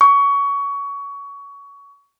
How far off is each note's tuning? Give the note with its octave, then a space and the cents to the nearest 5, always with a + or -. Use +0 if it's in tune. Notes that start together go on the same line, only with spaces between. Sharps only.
C#6 +25